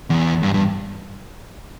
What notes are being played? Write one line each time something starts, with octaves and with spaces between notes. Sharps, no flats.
E2
G2
G2